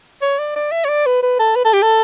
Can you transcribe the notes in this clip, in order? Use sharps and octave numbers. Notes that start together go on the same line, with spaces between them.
C#5
D5
D5
E5
C#5
D5
B4
B4
A4
B4
A4
G4
A4